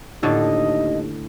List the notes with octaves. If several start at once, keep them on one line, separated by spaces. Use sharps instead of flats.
D#2 A2 D3 A4 D#5